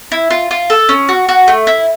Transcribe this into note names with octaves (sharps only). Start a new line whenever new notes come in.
E4
F4
F4
A4
C#4
F#4
F#4
A3
E4